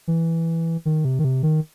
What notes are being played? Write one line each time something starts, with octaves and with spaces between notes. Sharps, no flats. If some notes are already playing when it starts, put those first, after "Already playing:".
E3
D#3
C3
D#3
C3
D#3